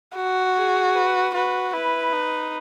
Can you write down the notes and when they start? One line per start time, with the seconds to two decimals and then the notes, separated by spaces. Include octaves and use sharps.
0.16 F#4
0.56 G#4
0.95 B4
1.34 F#4 B4
1.73 E4 B4
2.13 D#4